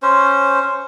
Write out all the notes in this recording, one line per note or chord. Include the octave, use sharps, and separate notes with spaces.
C#4 C5